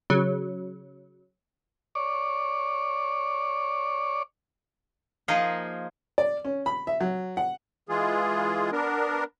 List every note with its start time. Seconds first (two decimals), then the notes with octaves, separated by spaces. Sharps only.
0.10 C#3 F#3
1.95 C#5 D5
5.28 F3 A#3 D#4 F4 G#4 D#5
6.18 D5
6.45 C#4
6.66 B5
6.87 E5
7.01 F#3
7.37 F#5
7.89 E3 G#3 F4 G#4
8.72 B3 D4 A#4